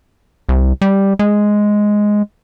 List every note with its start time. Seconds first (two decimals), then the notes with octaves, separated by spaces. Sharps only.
0.49 C2
0.81 G3
1.19 G#3